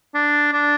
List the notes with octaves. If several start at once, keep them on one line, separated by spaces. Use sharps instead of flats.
D4
D4